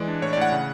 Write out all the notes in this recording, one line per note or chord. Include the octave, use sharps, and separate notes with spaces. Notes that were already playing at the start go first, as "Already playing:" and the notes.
Already playing: E3 G#3 D5
D4
A2 C#5
D5
A2 F#5
C#3